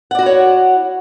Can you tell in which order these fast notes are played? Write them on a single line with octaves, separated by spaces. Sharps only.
F#5 D5 F#4 E4 C#5